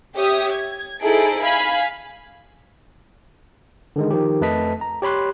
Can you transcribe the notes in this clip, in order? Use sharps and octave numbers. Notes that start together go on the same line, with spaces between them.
G4 C#5 E5 D#6
G#6
D#4 E4 G#4 A4 C5 D7
F5 G#5 B5 B6
D3 D#3 G#3
D#3 F3 G4
F2 A3 B4 D#5 A5 B6
A#5
G4 C#5 B5 C6 F#6